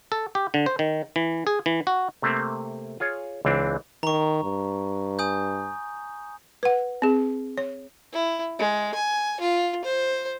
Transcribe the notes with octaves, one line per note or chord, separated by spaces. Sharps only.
A4
G4
D3
C5
D#3
E3
G#4
E3
F#4
C3 A3 A#3 C4
F4 G#4 C#5
C#2 E3 C4 D4
D#3 A#5 C#6
G2
G#5 D#6 G6
B4 F#5
C4 G#4
C#5
E4
G#3
G#5
F4
C5